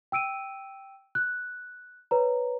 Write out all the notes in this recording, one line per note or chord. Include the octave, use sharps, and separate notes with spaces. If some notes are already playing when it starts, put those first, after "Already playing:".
G5 E6 D7 D#7
F#6
B4 C#5 A#5